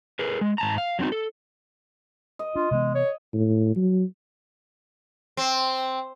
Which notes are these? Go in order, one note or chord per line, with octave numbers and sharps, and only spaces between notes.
G#4 A#4 B4
G#3
G#2 A5 A#5
F5
F#3 B3 C4 D#4 F#4
A4
D#5
D4 F4
C3 E3 G#3 B3
C#5
A2
F#3
C4